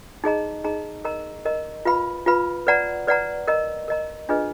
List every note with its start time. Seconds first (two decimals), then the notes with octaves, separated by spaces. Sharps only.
0.24 D#4 G#4 D#5 A#5
0.64 D#4 G#4 D#5 A#5
1.05 A#4 D#5 A#5
1.45 A#4 D#5 A#5
1.85 F4 B4 F5 B5
2.26 F4 B4 F5 B5
2.67 B4 D5 F#5 A#5
3.07 B4 D5 F#5 A#5
3.48 A#4 D#5 A#5
3.88 A#4 D#5 A#5
4.29 D4 F4 G#4 B4 D#5